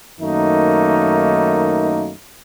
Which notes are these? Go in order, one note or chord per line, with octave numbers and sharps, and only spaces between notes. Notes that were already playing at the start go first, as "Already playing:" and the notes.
F#2 D#3 A3 A#3 D#4